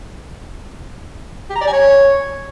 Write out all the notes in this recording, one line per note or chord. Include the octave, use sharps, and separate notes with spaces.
G4
A#5
D5
G#5
C#5